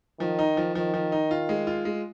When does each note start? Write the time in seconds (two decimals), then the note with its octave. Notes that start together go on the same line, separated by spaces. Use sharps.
0.20 D#3 F3
0.39 D#4
0.57 F3
0.75 D#3 F3
0.94 F3
1.12 D#4
1.31 F4
1.49 G#3
1.67 F4
1.85 G#3